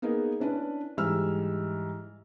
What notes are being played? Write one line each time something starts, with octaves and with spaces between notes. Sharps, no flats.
A#3 B3 D#4 G#4 A#4 B4
C#4 D4 E4 B4
G#2 E3 G3 E5 E6 F6